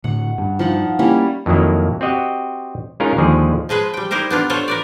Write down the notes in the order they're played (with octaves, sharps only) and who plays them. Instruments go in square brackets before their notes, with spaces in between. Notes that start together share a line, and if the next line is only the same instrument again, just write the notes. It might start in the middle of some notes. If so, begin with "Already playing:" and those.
[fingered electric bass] A2 D3 [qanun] F#5
[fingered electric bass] G2 G3 D4
[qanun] F3 D#4 F#5
[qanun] G3 C#4 E4 [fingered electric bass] A#3
[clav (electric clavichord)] F2 D#3 F#3 A#3 E4
C4 F#4 G4 D#5 F#5
G#3 C#4 D#4 F4 A#4
D#2 D3 F3 G#3 G#4
[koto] F3 G#3 G#4 B4
G3 G5
D#4 E4 G4 A#4 C5
B3 D4 F4
F4 A4 C5 C#5
A#4 B4 D5